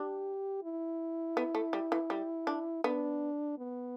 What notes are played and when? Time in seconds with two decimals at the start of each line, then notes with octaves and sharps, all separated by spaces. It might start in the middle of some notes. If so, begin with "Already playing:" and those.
Already playing: D4 G4
0.63 E4
1.37 B3
1.55 A3
1.73 G3
1.92 E3
2.10 G3
2.47 D4
2.84 B3 D4
3.58 B3